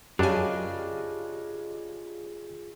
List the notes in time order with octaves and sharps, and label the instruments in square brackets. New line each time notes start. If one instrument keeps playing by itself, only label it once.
[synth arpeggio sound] F#2 G#5 [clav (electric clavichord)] C#3 D4 [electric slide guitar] F4 G#4 D#5 [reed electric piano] G4